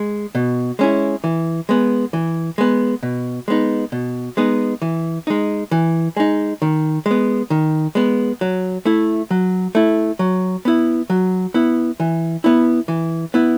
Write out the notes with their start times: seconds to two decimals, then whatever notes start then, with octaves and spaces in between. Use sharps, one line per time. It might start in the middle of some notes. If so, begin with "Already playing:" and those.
Already playing: G#3
0.35 B2
0.79 G#3 C#4 E4
1.24 E3
1.69 G#3 B3
2.13 E3
2.58 G#3 B3
3.03 B2
3.48 G#3 B3 D#4
3.92 B2
4.37 G#3 B3 D#4
4.82 E3
5.27 G#3 D#4
5.71 E3
6.17 G#3 D#4
6.62 D#3
7.06 G#3
7.11 B3
7.50 D#3
7.95 G#3 B3
8.41 F#3
8.85 A3 E4
9.31 F#3
9.75 A3 E4
10.19 F#3
10.65 B3 E4
11.10 F#3
11.54 B3 E4
12.00 E3
12.44 B3 E4
12.88 E3
13.34 B3 E4